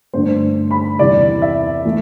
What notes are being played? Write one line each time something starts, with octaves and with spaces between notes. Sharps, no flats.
G2 D3 A3 D4 C5
B5
E2 C3 E3 G3 D5
E5
E3 A3